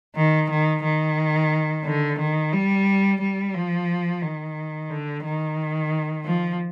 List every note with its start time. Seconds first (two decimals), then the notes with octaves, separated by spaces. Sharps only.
0.16 D#3
0.50 D#3
0.84 D#3
1.85 D3
2.19 D#3
2.52 G3
3.21 G3
3.54 F3
4.22 D#3
4.90 D3
5.24 D#3
6.25 F3